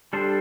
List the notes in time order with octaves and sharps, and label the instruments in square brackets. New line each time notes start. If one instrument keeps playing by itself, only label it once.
[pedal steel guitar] G3 D4 A4 C5 [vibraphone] G4